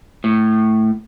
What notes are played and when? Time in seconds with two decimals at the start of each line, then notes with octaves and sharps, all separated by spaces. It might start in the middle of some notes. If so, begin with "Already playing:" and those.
0.24 A2